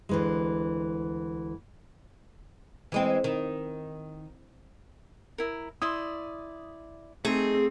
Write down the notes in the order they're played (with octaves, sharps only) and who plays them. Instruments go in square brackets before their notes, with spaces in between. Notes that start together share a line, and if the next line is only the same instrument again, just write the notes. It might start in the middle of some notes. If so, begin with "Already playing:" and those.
[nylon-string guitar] D2 E3 G#3
[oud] E3 G#3 C4
D#3
[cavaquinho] E4 A#4
[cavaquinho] E4 D5 C6 [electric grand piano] D#6
[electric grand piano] A3 [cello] C4 [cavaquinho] D#4 [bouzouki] G#4